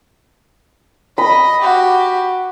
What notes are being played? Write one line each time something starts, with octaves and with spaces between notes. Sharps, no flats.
D#5 B5
F#4 G4